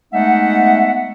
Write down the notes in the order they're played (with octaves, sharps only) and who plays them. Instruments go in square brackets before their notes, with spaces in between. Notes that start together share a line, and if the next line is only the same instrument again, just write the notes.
[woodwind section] G#3 A3 B3 D#4 E5 F#5